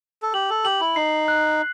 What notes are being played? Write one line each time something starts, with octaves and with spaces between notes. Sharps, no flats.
A4
G4 F#7
A4
G4 F#7
E4
D#4 C7
F#6